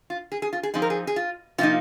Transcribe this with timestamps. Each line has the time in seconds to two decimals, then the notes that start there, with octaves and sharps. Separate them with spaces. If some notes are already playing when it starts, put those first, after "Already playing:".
0.10 F4
0.32 G#4
0.42 G#4
0.53 F4
0.63 G#4
0.74 F3 C4 D#4 G#4
0.82 A#4
0.90 G#4
1.07 G#4
1.16 F4
1.58 C3 F3 A#3 D#4 F4